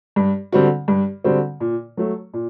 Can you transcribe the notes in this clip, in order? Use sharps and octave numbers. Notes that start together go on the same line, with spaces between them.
G2
D3 G3 C4 F#4
G2
D3 G3 C4 F#4
A#2
F#3 A3
A#2